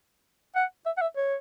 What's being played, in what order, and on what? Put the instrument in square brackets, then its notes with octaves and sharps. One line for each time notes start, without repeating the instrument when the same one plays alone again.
[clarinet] F#5
E5
F#5
E5
C#5